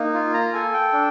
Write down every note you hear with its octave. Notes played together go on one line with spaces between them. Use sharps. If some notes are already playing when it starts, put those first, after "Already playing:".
Already playing: A#3 D#4
F4
A#5
A4 G#5
G5
D4